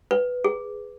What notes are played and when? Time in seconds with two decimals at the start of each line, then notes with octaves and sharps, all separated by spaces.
0.11 B4
0.44 G#4